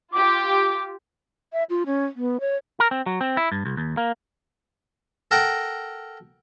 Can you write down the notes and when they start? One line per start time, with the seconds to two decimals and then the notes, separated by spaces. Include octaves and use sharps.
0.13 F4 G4 D6
1.53 E5
1.70 F4
1.86 C#4
2.16 B3
2.40 C#5
2.80 A#4
2.91 C4
3.06 F#3
3.21 C4
3.37 E4
3.52 G2
3.65 C2
3.77 D#2
3.97 A#3
5.31 A4 A#4 F#5 G5 A#5